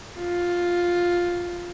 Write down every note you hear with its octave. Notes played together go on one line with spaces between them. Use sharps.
F4